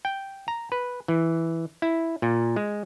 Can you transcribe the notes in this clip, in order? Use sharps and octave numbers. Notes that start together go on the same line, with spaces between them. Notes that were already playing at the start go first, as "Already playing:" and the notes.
G5
A#5
B4
E3
E4
A#2
G#3